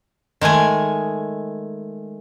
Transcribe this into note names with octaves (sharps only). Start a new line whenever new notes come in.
D#3 G#3 A3 G#5